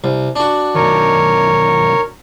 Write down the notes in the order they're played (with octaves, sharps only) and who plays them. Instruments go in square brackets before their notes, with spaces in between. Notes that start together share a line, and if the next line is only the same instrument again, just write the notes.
[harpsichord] C2
D4 F#4
[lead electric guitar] B1 D#3 [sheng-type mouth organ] A#4 C#5